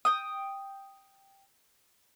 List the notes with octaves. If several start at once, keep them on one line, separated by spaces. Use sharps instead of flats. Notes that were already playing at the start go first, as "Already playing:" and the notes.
G5 D#6